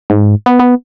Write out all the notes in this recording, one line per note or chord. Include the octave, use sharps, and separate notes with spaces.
G#2
B3
B3